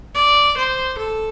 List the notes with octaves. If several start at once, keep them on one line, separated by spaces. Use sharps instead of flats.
D5
C5
A4